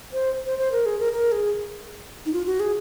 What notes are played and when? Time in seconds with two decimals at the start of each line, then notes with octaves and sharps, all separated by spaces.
0.13 C5
0.46 C5
0.59 C5
0.72 A#4
0.86 G#4
1.00 A#4
1.13 A#4
1.32 G#4
2.26 D#4
2.33 F4
2.46 F#4
2.60 G#4